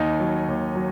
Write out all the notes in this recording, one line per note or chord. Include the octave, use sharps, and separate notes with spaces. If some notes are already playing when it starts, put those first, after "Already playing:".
Already playing: D#2 D#4
F#3
D#2
F#3